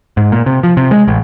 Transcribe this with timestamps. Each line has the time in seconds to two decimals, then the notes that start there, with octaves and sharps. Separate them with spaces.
0.17 G#2
0.32 A#2
0.46 C3
0.63 F3
0.77 C3
0.91 G#3
1.08 A1